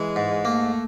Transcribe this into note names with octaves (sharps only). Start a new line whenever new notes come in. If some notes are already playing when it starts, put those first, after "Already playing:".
Already playing: E3 G#3
G#2
A3 A#3